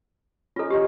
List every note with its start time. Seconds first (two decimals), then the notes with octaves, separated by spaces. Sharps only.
0.56 C#4 D#4 F4 A4
0.70 D#4 G4 C5 C#5